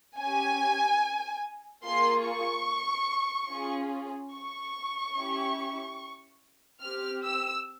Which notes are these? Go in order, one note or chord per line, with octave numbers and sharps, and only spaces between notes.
C#4 G4 G#5
A#3 F4 G#4 C6
C#6
C#4 F4 G#4
C#6
C#4 E4 G4
C4 G4 F6
E6